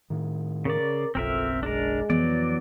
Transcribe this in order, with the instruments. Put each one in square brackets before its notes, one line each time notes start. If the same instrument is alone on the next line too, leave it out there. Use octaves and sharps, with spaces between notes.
[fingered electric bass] A2 D#3
[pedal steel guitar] C#3 D5 [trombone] A#4
[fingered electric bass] F#1 B1 [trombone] F2 [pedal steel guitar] C4 A#4 E5
[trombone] G#3 [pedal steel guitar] D4 A#4
[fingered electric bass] F2 [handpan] E3 B3 [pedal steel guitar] F#3 D5